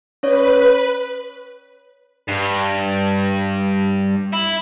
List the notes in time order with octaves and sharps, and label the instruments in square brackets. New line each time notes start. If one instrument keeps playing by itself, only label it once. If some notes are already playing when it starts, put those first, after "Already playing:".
[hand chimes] C#4 C#5 D5 [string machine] B4
[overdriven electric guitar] G2
E4